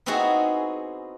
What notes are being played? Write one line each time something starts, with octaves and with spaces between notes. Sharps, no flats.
B3 C4 D#4 E4 F#4 G#4